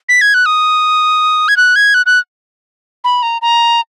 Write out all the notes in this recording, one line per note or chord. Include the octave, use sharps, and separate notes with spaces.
B6
G#6
F#6
D#6
G#6
F#6
G#6
F#6
F#6
B5
A#5
A#5